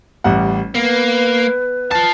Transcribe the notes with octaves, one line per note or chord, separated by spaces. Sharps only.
A1 G3 F#5
A#3 B3 B4
F4 A5 A6